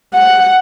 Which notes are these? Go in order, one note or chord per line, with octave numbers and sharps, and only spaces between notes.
F#5